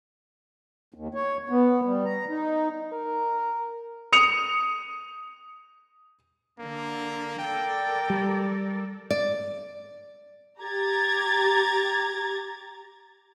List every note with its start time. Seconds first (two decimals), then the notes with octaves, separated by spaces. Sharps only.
0.94 D#2
1.15 C#5
1.49 B3
1.85 G3
2.05 A#5
2.29 D#4
2.93 A#4
4.13 D#6 C#7 F7
6.59 D3 A#3
7.39 A4 A#4 D5 G5
8.10 G3
9.10 D5
10.61 G4 A#5 G#6 A6